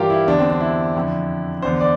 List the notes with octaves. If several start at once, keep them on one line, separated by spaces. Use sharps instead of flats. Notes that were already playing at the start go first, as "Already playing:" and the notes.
Already playing: G2 E3 F4 G4 A#4
E4
E2 D3 D4
C4
D4
E4
F2 D3
E2 D3 C5
D5